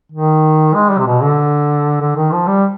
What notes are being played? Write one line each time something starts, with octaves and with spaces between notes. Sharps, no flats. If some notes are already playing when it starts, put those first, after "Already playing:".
D#3
G#3
G3
C3
B2
D3
D3
D#3
F3
G3